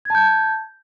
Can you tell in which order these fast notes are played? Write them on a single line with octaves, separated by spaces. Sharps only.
G#6 A5 G6